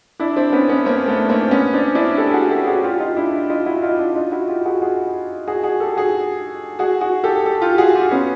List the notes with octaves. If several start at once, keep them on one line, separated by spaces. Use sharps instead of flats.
D4 E4
C4 D4
B3 C#4
B3 C#4
A#3 C4
A3 B3
A#3 C4
B3 C#4
C4 D4
D4 E4
G4 A4
F#4 G#4
G4 A4
F#4 G#4
F4 G4
D#4 F4
D4 E4
D#4 F4
E4 F#4
D#4 F4
D4 E4
D#4 F4
E4 F#4
F4 G4
F#4 G#4
F#4 G#4
F#4 G#4
F#4 G#4
G4 A4
F#4 G#4
F#4 G#4
F#4 G#4
G4 A4
G4 A4
F4 G4
F#4 G#4
F4 G4
B3 C#4